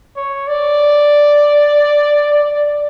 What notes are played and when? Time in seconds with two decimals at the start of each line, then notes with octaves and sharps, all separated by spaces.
0.16 C#5
0.47 D5
2.34 D5